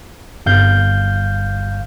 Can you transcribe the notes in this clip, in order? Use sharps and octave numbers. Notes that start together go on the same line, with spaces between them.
G1 F5 G6